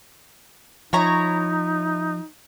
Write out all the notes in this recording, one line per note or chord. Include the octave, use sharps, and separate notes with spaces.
F3 D#4 E4 C#5 A#5